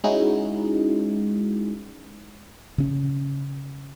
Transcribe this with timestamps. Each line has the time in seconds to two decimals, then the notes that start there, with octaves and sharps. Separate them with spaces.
0.04 G#3 C#4 D#4 E4 F#4 G#4
2.78 C#3 C#4